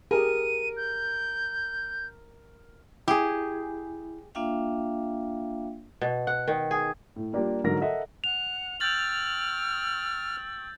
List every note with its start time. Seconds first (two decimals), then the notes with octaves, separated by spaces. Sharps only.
0.11 G4 G#4 A#4 D#7
0.77 G6
3.08 E4 G4 G#4
4.35 A#3 D4 F4 E5 F5 G5
6.01 B2
6.27 F#5
6.48 D#3
6.71 G#4
7.16 A2
7.33 G3 A#3 D4 F4 G4 A#4
7.64 G#2 D3 F#3 A#4 A#6
7.81 A4 A#4 D#5 E5 F#5
8.24 F#5 F#6 F7
8.80 G5 C#6 E6 F6 G6 A6 F#7